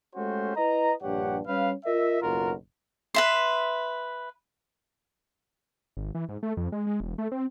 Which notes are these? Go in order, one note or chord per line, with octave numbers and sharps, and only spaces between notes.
G#3 A3 C#4 F#4 G4 C5
E4 B4 D#5 A#5
A#1 G2 G4 C#5 F#5
G3 C#4 B4 F5
F4 A#4 D#5 E5
F#1 B1 F4 F#4 A#4
B4 E5 C6
G#1
E3
G#2
A3
F2
G#3
G#3
E1
A3
C4